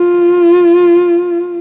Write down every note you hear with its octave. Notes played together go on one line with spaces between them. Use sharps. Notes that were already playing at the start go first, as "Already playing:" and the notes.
Already playing: F4